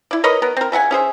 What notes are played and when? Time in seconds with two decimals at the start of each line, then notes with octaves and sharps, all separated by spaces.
0.11 E4 D5
0.24 A#4 B4 C#5 D#5
0.42 B3 A#4
0.57 C4 A#4
0.72 C#3 E5 F#5 G#5
0.91 C#4 G#4 C5 E5